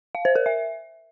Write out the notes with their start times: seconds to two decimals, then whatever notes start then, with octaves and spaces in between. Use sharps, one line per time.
0.15 F5
0.25 C5
0.35 A#4
0.46 E5